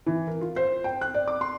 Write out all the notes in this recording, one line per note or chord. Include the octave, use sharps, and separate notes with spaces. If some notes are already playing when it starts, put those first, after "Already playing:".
E3
A#4
F4
C5
G5
F#6
D5
D6
C6